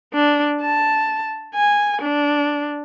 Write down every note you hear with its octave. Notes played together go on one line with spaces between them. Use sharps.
D4
A5
G#5
D4